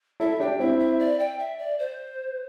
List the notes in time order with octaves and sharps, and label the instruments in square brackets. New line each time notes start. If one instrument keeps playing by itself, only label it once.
[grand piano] E4 A4 [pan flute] E5
[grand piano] D4 G4 [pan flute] G5
[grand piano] C4 E4 [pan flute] E5
[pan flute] E5
D5
G5
E5
D5
C5